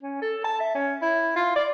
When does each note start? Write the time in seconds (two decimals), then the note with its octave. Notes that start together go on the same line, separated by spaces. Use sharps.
0.03 C#4
0.22 A4
0.44 A5
0.60 E5
0.75 C#4
1.02 E4
1.36 F4
1.56 D5